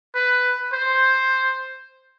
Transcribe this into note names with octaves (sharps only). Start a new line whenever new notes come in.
B4
C5